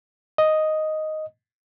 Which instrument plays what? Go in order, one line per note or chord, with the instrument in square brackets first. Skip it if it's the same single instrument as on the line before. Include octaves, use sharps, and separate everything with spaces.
[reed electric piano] D#5